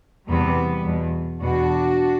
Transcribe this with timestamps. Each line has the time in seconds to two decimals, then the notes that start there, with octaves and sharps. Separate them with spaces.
0.29 E2 C3 E3 G3 B3
0.84 E2 B2
1.41 E2 B2 D4 F#4